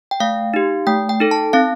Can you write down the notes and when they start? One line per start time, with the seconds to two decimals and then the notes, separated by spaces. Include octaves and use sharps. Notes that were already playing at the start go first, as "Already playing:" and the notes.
0.11 G5
0.20 A3 F5
0.54 D#4 G4
0.87 A3 G5
1.09 G5
1.20 D#4 A4
1.31 A5
1.53 C4 F5